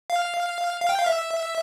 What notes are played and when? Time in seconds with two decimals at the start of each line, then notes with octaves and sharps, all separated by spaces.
0.10 F5
0.81 F5
0.89 G5
0.98 F5
1.06 E5